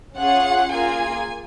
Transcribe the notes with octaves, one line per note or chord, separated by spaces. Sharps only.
C#4 F4 G#4 F#5
A#3 F4 G#4 G#5